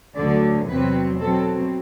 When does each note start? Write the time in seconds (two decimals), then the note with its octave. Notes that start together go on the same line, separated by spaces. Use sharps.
0.16 D2 D3 F#3 D5
0.68 E2 C3 F#3 C4 B4
1.20 B2 F#3 C4 A4